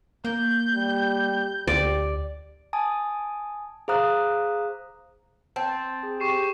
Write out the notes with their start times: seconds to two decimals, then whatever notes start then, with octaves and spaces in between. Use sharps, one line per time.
0.25 A#3 G6
0.75 G3
1.67 D2 G4 D5
2.73 G#5 A5 D#6
3.88 G#4 C5 F5 A#5 D#6 F#6
5.56 C4 A5
5.69 A6
6.03 G#4
6.20 G4 C#6 C7 E7